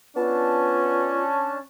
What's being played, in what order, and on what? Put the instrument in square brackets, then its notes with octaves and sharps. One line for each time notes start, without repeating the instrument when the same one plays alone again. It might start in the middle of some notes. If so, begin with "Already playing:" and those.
[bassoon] B3 [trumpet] C#4 [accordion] D4 A5 [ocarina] F4